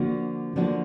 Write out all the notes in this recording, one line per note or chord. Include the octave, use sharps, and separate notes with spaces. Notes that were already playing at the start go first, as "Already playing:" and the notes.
Already playing: D3 F3 A#3 D4 F#4
D3 F3 A#3 D4 F#4